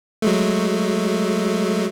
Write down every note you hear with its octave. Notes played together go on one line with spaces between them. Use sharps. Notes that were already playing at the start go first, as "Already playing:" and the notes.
F#3 G#3 A3